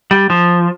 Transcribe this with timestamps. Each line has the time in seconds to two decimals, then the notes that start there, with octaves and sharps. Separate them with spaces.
0.11 G3
0.30 F3